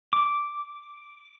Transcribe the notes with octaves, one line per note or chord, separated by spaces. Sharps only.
D6